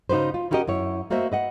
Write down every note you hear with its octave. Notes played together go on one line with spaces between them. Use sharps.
C#3 D#4 F#4 B4 C5
F4
C#4 E4 F#4 G4 A#4 D#5
F#2 E4 C#5
A3 A#3 F#4 C5 D#5 E5
B4 D#5 F#5